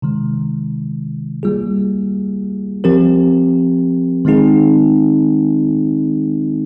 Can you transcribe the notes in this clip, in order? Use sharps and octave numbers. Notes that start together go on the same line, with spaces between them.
C3 D#3 G#3
G3 A#3 F4 G#4
F3 C4 G4 A#4
D#3 G#3 C4 D#4 G#4